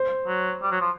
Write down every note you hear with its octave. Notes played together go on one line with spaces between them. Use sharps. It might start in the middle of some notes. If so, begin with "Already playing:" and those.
Already playing: C5
F#3
G3
F#3
F3